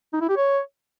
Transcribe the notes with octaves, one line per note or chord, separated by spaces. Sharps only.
D#4
E4
G4
C#5